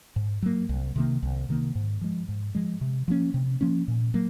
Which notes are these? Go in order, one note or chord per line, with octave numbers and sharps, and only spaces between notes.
G#2
F#3 A#3
C2
C3 D#3 A#3
C2
C3 D#3 A#3
G#2
F3 G#3
G#2
F3 G#3
C3
F3 A#3 C#4
C3
F3 A#3 C#4
A#2
F#3 A#3